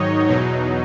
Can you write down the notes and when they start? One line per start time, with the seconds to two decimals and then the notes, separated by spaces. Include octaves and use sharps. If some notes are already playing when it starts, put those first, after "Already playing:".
Already playing: G#2 D#3 F#3 D#4 C#5 D#5
0.28 E2 B2 F#3 D#4